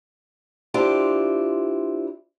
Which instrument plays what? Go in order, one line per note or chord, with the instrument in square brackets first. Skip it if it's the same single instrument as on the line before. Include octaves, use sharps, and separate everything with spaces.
[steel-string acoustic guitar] D4 E4 F4 G4 C5